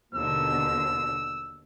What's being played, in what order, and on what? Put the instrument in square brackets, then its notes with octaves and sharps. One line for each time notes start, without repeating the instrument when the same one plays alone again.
[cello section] D#2 B2 D3 [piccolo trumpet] E6